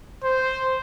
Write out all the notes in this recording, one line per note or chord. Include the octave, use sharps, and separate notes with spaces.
C5